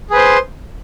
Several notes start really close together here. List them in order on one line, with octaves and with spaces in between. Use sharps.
G#4 B4 C5 C6